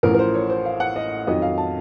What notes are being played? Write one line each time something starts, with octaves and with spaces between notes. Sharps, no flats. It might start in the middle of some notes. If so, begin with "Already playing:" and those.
A1 A2 F3 A#4
A#4
C5
C#5
C5
F5
F#5
D#5
F2 D#3 F#3 D#5
F5
A5